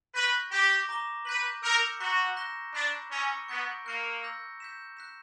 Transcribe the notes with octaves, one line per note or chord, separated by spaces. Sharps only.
B4 C#6 G6 A#6
G4 D6 A#6 E7 G7
A#5 D6 A#6 E7 G7
B4 G6 B6 F#7
A#4 E6 G6 C#7 E7 G7
F#4 A#5 C#6 F#6 B6
F#6 A#6 E7 G7
D4 B5 F#6 B6 E7
C#4 C#6 E6 A#6 C#7
B3 C#6 G6 A#6 D7 G7
A#3 F#6 C#7 G7
E6 G6 A#6
G6 B6 E7
F#6 B6 E7